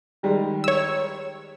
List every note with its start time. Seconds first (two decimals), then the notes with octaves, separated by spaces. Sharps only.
0.23 D#3 G3 G#3
0.64 C#5 E6